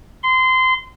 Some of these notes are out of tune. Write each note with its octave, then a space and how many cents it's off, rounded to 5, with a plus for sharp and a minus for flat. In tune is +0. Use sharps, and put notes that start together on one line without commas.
C6 -20